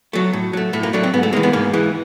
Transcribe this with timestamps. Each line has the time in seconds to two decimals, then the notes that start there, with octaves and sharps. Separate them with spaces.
0.13 F#3 A3
0.33 A2
0.53 F#3 A3
0.73 A2 A3
0.83 A#3
0.93 F#3 A3 D4
1.03 C4
1.14 G#2 B3
1.23 A3
1.33 G#3 A#3
1.37 E3
1.43 B3
1.53 G#2 A#3
1.74 E3 G#3